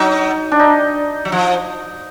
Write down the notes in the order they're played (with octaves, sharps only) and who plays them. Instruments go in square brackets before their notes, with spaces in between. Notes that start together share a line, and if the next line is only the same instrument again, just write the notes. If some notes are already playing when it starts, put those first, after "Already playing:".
Already playing: [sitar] F#3 [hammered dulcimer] D#4
[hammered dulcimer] D4
D#4
[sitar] F#3
F3